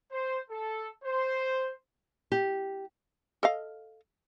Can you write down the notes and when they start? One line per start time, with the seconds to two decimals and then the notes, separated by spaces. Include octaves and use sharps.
0.11 C5
0.50 A4
1.04 C5
2.32 G4
3.43 A4 D#5 F5